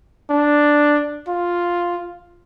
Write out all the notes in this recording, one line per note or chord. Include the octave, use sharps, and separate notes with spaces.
D4
F4